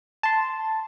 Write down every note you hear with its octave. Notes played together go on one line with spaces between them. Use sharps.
A5 C6